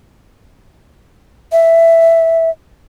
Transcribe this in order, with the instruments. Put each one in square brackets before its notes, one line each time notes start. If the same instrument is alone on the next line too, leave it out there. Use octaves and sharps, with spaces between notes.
[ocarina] E5